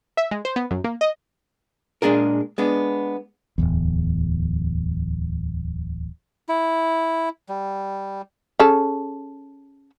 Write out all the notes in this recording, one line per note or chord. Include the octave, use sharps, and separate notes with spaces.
E5
G#3
C5
B3
F#2
A#3
D#5
A#2 G#3 D4 G#4 A#4
G#3 B3 D4
D1 G#1 E2
E4
G3
C#4 G#4 A4